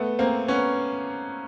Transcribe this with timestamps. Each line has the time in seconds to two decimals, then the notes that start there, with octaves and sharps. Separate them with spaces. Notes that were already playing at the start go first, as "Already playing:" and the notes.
Already playing: A3 B3
0.19 A#3 C4
0.48 B3 C#4